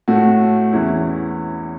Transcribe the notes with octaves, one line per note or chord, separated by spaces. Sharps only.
A2 A3 F#4
E2 E3 C#4 E4